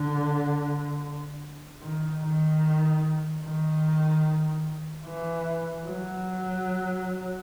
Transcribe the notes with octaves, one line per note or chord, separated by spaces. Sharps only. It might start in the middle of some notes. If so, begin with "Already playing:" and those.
Already playing: D3
D#3
D#3
D#3
E3
F#3